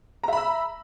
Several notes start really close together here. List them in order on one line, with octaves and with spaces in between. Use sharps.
A#5 E5 B5 E6